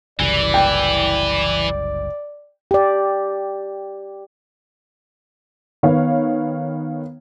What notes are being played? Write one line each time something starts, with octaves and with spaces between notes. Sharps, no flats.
F#1 C2 E3 D5
G5
G4 D5
D#3 B3 C#5 F5